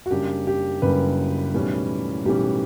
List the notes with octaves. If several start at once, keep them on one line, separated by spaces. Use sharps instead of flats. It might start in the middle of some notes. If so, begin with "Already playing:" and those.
F#4
F#1 F#2 C#3 G3 D4 G4
G4
F#1 F#2 C#3 G3 D4 B4
B1 A2 E3 G3 C#4
B1 A2 E3 G3 C#4 G4